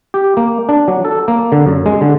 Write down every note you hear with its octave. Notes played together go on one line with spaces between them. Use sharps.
G4
A#3
D4
F#3
A4
A#3
D3
F#2
G#3
D3